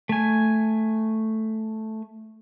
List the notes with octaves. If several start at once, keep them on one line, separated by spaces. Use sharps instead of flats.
A3 G#5